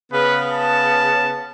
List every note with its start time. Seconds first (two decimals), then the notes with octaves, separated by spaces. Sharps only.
0.12 C#3 B3 B4
0.52 A5